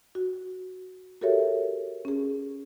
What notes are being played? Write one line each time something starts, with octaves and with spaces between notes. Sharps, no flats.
F#4
F#4 G4 A4 A#4 C#5 E5
C#4 G#4